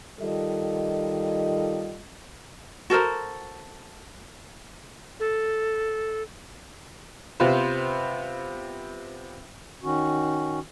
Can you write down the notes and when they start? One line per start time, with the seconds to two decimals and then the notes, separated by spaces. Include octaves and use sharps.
0.20 D#3 G3 F4 A4 D#5
2.90 F#4 A4 A#4 C5
5.20 A4
7.40 C3 B3 F4 B4 C5
9.83 D#3 C#4 F#4